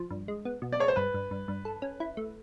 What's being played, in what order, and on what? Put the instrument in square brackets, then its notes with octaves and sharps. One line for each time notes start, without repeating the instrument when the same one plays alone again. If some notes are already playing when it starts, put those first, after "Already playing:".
Already playing: [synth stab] F3
G2
G#3
B3
B2
[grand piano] D5
[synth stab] G#3 [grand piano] C#5
[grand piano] C5
[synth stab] G2 [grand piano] B4
[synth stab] G2
G2
G2
A4
C#4
E4
A3